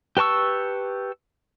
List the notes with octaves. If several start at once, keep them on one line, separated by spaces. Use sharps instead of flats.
G4 B4 A5 C#6 E6